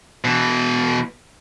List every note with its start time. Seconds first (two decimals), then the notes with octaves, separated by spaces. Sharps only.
0.25 B2 E3